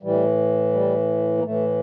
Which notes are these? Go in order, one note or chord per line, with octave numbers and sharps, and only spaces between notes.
A2 E3 G3
G3
A#3
A2 E3 A3